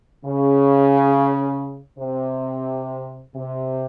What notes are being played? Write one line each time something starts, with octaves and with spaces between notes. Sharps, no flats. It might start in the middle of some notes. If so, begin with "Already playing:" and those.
C#3
C3
C3